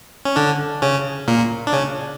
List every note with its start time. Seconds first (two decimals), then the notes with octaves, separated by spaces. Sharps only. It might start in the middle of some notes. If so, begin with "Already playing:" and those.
0.25 C#4
0.36 D3 D4
0.82 C#3 C#4
1.28 A#2 A#3
1.67 D4
1.73 C#3 C#4